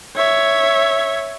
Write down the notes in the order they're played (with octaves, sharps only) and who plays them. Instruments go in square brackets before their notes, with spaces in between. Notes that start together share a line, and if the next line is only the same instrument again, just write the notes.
[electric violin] C#5 E5